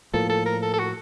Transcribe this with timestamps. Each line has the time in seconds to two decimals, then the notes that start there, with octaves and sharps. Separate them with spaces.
0.14 A2 F3 A#3 A4
0.30 A4
0.46 A#4
0.62 A4
0.74 A4
0.79 F#4